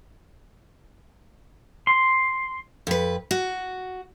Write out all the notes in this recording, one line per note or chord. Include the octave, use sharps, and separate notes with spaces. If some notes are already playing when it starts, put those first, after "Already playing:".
C6
F2 B4
F#4